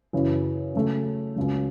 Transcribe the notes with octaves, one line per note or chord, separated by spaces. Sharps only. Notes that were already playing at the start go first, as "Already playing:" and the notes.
F#2 C#3 E3
C#3 F#3 A3 C#4
C#2 C#3 F#3